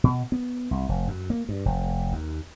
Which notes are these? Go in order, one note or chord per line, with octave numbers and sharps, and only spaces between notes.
B2
B3
C2
F1
F#2
A#3
G2
F1
D#2